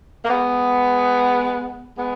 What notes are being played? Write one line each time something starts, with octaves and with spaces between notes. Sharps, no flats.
A#3
G#3 B3
G#3 B3